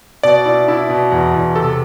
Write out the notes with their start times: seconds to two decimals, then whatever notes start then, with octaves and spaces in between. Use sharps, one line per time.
0.23 B2 D5
0.46 E4
0.68 E4
0.89 B2
1.11 E2
1.34 E2
1.55 C3 A4